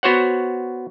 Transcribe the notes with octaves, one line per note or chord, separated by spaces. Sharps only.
B3 F#4 C5 C#5 F#5